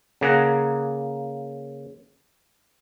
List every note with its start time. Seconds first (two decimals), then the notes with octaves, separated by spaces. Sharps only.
0.21 C#3 A#3 G#4 F#5 A#5